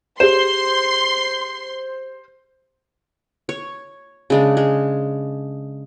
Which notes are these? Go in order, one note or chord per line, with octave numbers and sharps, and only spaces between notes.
G4 G#4 C5 C6 E7
C#5
C#3 G#3 D4
G#3